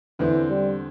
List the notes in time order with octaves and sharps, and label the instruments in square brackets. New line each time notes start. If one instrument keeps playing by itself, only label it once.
[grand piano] E2 D3 C4 [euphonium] E3
[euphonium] G3